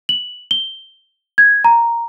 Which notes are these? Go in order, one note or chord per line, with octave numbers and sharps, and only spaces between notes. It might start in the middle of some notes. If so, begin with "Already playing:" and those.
F#7
G7
G#6
A#5